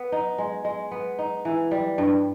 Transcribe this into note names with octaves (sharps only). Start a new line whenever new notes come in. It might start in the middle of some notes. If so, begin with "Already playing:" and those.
Already playing: B3
D#4
G#3
G#3
B3
D#4
E3
G3
G2